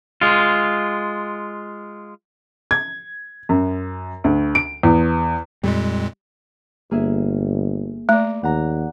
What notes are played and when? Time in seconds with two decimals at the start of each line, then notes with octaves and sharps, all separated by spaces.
0.21 G#3 F4
2.71 G#6
3.49 F#2
4.24 D2
4.55 D7
4.83 E2
5.64 F2 A#2 G3 G#3
6.91 G1 A#3 G#4 E5
8.09 A3 D5 A#5
8.44 D#2 F#5 A#5